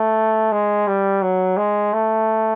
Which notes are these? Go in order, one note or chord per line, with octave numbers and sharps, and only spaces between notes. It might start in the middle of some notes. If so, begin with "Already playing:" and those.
Already playing: A3
G#3
G3
F#3
G#3
A3